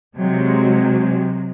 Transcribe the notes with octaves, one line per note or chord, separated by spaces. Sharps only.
C3 F#3 G#3